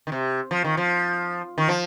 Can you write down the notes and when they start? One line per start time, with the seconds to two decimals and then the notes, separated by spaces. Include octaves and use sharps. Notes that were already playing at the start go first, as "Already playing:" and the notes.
0.07 D#3
0.12 C3
0.51 F3
0.64 D#3
0.77 F3
1.58 D#3
1.68 F3